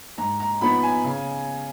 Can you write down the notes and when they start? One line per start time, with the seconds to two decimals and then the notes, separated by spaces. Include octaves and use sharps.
0.18 G#2 A#5
0.40 A#5
0.61 F3 B3 D#4 B5
0.83 G#5
1.04 C#3